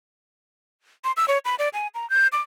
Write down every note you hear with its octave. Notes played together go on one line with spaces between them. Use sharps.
C6
E6
C#5
B5
D5
G#5
A#5
G6
D6